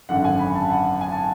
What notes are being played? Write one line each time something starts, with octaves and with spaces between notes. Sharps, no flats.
G#1 F#2 D3 F#5
G#5
B5
A5
F#5
G#5
A5